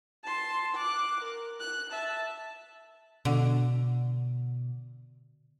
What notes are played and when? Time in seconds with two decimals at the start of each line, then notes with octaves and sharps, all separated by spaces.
0.24 A5 C6
0.75 D6 F#6
1.21 A#4
1.60 F#6
1.91 E5 A5
3.25 B2 D3